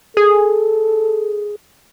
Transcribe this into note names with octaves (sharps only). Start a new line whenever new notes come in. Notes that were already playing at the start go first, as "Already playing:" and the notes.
G#4 A4